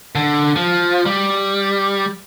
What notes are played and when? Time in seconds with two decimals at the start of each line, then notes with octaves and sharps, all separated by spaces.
0.15 D3
0.56 F3
1.06 G3